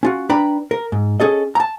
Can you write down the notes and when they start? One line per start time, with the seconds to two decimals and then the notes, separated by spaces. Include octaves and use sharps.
0.03 C#4 F4 F#4
0.29 D4 B4 G5 A#5 B5
0.71 A#4
0.92 G#2
1.20 C#4 G#4 A4 D#5
1.55 A5 A#5